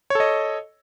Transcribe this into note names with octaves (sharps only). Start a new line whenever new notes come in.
A4 C#5 D#5